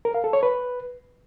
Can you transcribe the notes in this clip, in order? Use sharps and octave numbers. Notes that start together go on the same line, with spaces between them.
A#4
F5
A4
C#5
B4